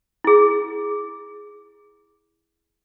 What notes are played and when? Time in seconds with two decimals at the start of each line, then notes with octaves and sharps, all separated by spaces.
0.24 E4 G#4